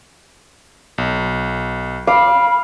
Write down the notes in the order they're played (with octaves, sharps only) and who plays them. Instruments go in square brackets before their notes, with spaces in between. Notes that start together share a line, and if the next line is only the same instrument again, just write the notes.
[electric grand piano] B1
[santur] F5 [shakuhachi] B5 [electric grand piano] D6